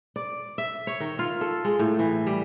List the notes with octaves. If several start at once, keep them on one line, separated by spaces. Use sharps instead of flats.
D5
E5
C#5
D#3
F4
A4
G#3
A2
E3
G3